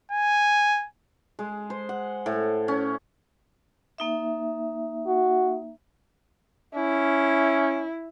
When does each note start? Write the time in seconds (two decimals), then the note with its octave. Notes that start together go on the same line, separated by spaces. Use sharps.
0.11 G#5
1.39 G#3
1.70 C5
1.89 F#5
2.26 A2
2.68 C#4
3.98 A#3 D#4 E5
5.07 F#4
6.75 C#4 E4